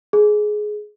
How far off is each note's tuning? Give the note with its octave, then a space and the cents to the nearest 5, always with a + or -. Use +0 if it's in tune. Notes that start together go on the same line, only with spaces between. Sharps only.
G#4 +15